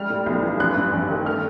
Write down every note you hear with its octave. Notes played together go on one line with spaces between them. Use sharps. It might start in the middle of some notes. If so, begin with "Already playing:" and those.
Already playing: G3 G#3 F6
A2
B1
E3
A1 F#6
G2
A1
D#3
A3 F6